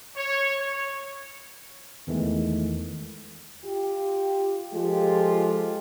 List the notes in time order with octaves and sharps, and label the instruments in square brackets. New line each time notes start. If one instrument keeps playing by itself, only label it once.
[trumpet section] C#5
C#5
[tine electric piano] E2 D#3 E3 G#3 A3
[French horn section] F4 G4
F3 G#3 F4 G4 A4